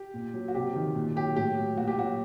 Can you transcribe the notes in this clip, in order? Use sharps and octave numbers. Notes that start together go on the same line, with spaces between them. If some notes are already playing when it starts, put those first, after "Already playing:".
Already playing: G4
A#2
F#3
F#4
C3 G4
D#3
A#2
F#3 G4
A2 G4
F#3
A#2 F#4
G4
F#3 F#4